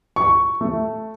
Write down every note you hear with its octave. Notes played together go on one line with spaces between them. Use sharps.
C#6
A3